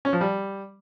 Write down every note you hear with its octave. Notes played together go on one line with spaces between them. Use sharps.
C#4
F3
G3